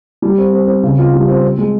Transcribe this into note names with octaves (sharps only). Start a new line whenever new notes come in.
G3
C4
C4
C4
C#3
F4
G3
C4
C4
G#3